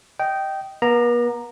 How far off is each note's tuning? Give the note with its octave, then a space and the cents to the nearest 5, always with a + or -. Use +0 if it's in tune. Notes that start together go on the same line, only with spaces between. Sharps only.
D#5 +0 G5 -15
B3 -45 A#5 +0